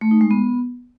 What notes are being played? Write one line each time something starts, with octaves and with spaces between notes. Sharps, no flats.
A3
D#4
G#3
B3